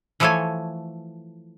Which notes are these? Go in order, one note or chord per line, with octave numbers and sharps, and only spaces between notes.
E3 F3 A3 A4 C#5 G#5